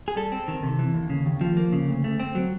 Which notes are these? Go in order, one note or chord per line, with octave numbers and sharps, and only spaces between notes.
G#4
G3 A4
C4
D#3
C3
E3
D#2
C#3
D#2
F3
A#3
C#3
D2
A3
C4
F#3